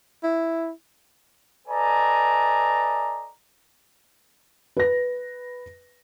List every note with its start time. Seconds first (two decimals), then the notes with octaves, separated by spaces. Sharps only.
0.23 E4
1.68 A4 B4 D5 D#5 G#5 A#5
4.77 B4 A#6